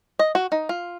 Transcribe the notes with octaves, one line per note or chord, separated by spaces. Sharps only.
D#5
F#4
D#4
F4